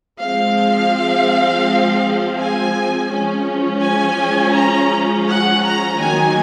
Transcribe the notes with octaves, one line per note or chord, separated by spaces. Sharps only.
F3 G#3 C4 F5
G#5
F3 G#3 C#4
G#5
A#5
F#5
A#5
D#3 F#3 A#3 G#5